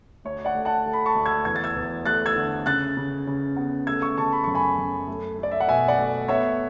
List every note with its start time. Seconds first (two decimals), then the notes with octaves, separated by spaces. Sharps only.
0.25 D2 C#5
0.45 D5 F#5
0.55 A3
0.65 F#5 A5
0.86 A3
0.93 B5
1.06 A5 C#6
1.15 D2
1.26 E6 G#6
1.45 E2 G#6
1.56 A6
1.64 E6 G#6
1.76 E2
2.06 A3 F#6 A6
2.26 E6 G#6
2.36 D3
2.66 C#3 F#6 A6
2.97 C#3
3.27 C#3
3.56 B3
3.87 A3 E6 G#6
4.02 C#6 E6
4.18 C#3 A5 C#6
4.33 B5
4.44 F#2 C#6
4.55 G#5 B5
4.78 F#2
5.08 A3
5.39 A3 D5
5.52 E5
5.60 F#5
5.68 B2 E5 G#5
5.88 D5 F#5
5.99 A3
6.28 B3 C#5 E5